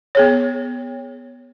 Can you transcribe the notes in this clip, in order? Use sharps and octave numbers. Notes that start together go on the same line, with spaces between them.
B3 G#4 C#5